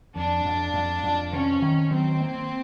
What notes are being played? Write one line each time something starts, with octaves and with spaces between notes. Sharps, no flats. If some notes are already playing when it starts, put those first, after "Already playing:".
F2 D4
F2
F2
F2
C3 C#4
D#3
F#3 C4
A#3